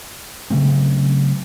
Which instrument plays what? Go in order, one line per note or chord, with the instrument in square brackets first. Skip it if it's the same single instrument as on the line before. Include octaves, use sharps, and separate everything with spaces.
[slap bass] C#3 F#3 A3 C4